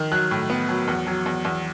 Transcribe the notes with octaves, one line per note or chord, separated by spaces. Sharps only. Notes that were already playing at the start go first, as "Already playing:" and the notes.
Already playing: D#3
F#3 F#6
A2
B3
F#3
E2
F#3
E2
E2